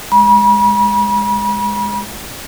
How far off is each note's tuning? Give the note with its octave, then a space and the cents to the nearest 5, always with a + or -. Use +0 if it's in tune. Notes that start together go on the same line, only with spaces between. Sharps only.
G#3 +0 B5 -40